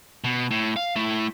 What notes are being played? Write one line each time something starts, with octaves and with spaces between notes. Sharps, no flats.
B2
A2
F5
A3 E4